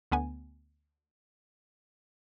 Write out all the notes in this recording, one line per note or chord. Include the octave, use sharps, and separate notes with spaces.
D2 B3 G#5